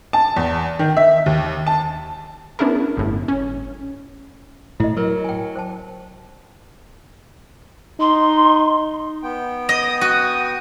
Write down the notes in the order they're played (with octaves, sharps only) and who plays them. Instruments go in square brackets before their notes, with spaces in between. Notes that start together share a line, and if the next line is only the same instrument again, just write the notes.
[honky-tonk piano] A5
E2
D#3
E5
D#2
A5
[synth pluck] B3 C#4 D4 E4 G#4 A#4
G1 A2
C#4
[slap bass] A2 [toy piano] E4 D#5
[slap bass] F#3 [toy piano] A#4 B4
[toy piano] G5 G#5
C5 G5 A5
[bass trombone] D#4 [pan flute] C6
[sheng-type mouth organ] B3 G5
[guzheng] D#5 [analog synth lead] D#6
[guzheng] F#4